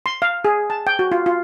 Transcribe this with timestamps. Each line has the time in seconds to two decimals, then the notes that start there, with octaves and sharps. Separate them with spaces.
0.06 C6
0.22 F5
0.45 G#4
0.70 A5
0.87 G5
0.99 F#4
1.12 F4
1.26 F4